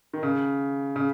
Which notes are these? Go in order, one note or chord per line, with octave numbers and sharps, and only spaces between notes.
D#3
C#3
C#3